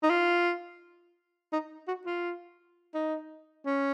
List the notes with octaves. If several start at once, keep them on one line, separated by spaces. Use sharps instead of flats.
D#4
F4
D#4
F#4
F4
D#4
C#4